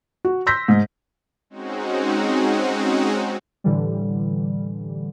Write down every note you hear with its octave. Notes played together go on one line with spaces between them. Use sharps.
F#4
C6 E6 G6 A#6 B6
G#2
G#3 C4 C#4 D#4 F#4
A2 D3 E3 G3